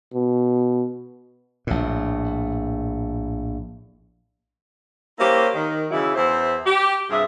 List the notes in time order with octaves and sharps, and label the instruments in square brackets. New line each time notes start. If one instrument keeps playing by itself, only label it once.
[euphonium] B2
[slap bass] A#1 A2
[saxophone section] A#3 C#4 E4 G4 C5
D#3
C#3 E3 F#3 E4
E2 E4 C5
G4
G2 C3 F4 G#4 E5